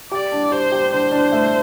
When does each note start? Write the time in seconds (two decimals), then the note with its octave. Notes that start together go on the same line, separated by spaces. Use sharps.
0.11 G4 D5
0.32 D4
0.51 G4 C5
0.72 G4
0.92 D4 C5
1.12 D4
1.32 A3